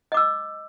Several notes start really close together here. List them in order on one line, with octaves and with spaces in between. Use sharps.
D#5 D6 E6